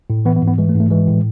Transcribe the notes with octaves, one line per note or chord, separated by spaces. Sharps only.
A2
E3 B3
B3
G#2
B3
E3 G#3
A3
G#2
A3
E3 G#3
A2